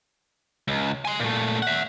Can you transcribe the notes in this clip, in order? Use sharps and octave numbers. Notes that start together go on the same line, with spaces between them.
C#2
G#5 C6
A#2 A3
E5 F#5